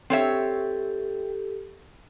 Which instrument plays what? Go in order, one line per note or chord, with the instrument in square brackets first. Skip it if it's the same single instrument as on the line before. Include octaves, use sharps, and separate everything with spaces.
[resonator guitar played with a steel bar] C4 C#5 E5 [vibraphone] G4 A4